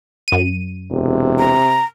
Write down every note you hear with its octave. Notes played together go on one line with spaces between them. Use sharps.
F#2 D#7
E1 C3
A#5